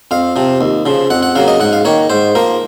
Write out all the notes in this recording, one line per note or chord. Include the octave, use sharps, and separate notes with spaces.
F2 F5
C3 F3
D#2
C#3 F3
F2 F#5
F#5
C#3 F#3 A#3 F5
D#5
G#2 F#5
F5
D#3 A#3 C#5
G#2 C5
F3 A#3 A#4